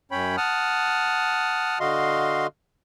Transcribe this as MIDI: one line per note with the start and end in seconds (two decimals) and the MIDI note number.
0.11 0.36 42
0.11 0.36 61
0.11 0.36 73
0.11 0.36 79
0.11 0.36 83
0.37 1.79 78
0.37 1.79 81
0.37 1.79 87
0.37 1.79 89
1.80 2.47 50
1.80 2.47 66
1.80 2.47 75
1.80 2.47 77
1.80 2.47 84